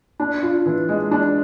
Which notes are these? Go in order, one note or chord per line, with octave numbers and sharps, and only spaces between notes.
D4
F4
E3
G#3
D4